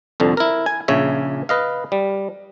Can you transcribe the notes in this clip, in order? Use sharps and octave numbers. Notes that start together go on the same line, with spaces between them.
C2 F2 D3
E4 A#4
G#5
A#1 C#3 C#5 E5
B4 D#5 F5
G3